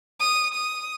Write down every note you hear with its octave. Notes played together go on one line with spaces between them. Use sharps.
D#6
D#6